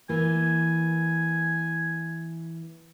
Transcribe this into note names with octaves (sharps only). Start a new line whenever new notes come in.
E3 A#3 G#5